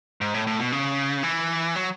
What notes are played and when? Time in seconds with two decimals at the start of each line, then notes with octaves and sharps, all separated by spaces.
0.21 G#2
0.34 A2
0.47 A2
0.59 B2
0.72 C#3
1.23 E3
1.76 F#3